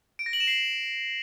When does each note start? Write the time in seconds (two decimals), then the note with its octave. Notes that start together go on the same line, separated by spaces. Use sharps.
0.19 D7
0.26 A#6
0.33 F#7
0.40 E7
0.47 C7